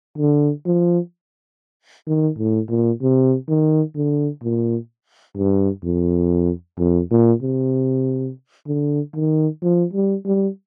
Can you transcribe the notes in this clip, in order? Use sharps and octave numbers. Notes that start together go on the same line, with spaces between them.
D3
F3
D#3
A2
A#2
C3
D#3
D3
A#2
G2
F2
F2
A#2
C3
D3
D#3
F3
G3
G3